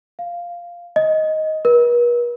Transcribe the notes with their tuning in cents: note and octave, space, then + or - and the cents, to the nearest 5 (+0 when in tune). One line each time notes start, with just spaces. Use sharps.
F5 -5
D#5 +10
B4 -45